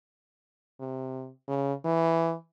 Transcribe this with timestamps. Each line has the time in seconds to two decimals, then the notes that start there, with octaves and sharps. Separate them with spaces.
0.80 C3
1.48 C#3
1.85 E3